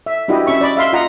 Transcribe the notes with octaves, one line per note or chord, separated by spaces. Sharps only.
E5
D4 E4 F#4 G4 D#5
C#4 E5 C#6
D5 D#5 B5 D6
E5 F5 C6
F4 D#5 F#5 A#5